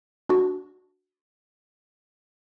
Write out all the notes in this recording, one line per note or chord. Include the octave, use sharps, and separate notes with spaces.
D4 F#4